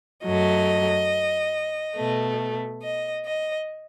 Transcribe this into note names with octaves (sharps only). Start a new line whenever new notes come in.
F#2 F#3 A3 D#5
B2 A3
D#5
D#5